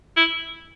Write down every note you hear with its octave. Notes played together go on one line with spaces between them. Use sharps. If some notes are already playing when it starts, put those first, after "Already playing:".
E4